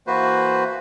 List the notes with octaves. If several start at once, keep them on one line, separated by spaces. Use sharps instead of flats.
E3 A#3 F#4 B4 C5